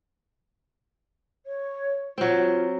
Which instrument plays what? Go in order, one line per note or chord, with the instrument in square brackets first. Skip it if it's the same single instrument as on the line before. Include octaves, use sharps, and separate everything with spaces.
[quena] C#5
[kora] F#3 C4 [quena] F4